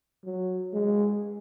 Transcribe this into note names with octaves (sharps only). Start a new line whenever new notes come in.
F#3
G#3